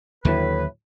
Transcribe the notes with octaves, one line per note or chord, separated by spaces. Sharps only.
D#2 A2 D3 F#3 B4